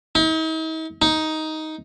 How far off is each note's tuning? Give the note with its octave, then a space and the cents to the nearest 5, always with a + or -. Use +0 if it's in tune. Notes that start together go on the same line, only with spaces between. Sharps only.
D#4 +45
D#4 +10